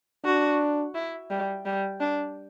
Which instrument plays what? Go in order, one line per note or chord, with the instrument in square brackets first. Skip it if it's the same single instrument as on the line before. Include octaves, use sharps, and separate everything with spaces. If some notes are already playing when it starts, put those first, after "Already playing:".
[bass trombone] D4 [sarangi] F#4
[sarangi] E4
G3
G3
D4